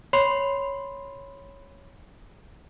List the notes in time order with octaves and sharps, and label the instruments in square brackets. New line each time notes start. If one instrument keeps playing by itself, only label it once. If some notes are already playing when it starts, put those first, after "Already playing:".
[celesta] C#5 B5 C6 C7 F7